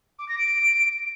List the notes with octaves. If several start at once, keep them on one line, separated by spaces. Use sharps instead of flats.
D6
A#6
D7